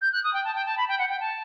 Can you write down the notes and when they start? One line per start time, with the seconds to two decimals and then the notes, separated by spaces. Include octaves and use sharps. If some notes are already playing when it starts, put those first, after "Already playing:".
0.01 G6
0.12 F#6
0.23 D#6
0.33 G5
0.44 A5
0.54 G5
0.65 A5
0.77 B5
0.88 G5
0.98 F#5
1.09 G5
1.20 A5